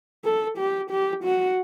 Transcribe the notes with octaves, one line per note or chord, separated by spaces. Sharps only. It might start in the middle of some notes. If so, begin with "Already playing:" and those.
A4
G4
G4
F#4